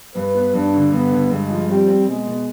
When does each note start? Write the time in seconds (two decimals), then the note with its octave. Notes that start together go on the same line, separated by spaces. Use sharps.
0.15 G2 B4
0.35 B3
0.54 G2 D4
0.73 D3
0.92 G2 B3
1.11 D3
1.30 G2 G#3
1.50 F3
1.69 G3 C4
1.88 C4
2.07 B2 G#3
2.27 B2